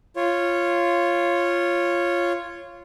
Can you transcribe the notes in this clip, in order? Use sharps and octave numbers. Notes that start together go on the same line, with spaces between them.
F4 C#5